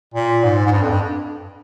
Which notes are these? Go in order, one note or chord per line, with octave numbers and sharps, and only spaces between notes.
A#2
G#2
G#2
G2
F2
G2